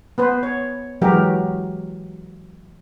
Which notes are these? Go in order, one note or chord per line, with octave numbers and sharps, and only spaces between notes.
B3 B4 C5
C#5
E3 F#3 G#3 F#4 G4 A#4